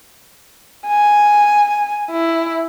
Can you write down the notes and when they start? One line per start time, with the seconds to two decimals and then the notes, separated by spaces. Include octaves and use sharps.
0.87 G#5
2.11 E4